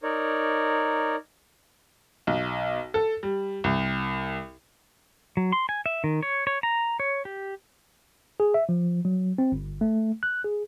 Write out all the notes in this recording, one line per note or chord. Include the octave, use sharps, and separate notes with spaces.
D#4 A#4 C#5 D5
B1
A4
G3
C2
F#3
C6
G#5
E5
D#3
C#5
C#5
A#5
C#5
G4
G#4
E5
F3
F#3
C4
G1
A3
F#6
G#4